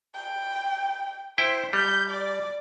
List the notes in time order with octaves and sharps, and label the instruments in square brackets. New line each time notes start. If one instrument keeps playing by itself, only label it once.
[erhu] G5
[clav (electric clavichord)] E4 G5 [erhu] C5
[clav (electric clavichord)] G3 [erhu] G6
[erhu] D5